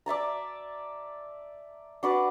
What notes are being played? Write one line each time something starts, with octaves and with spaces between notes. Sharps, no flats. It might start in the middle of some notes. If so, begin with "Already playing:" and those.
D5 E5 A5 A#5
D4 F#4 B4 D5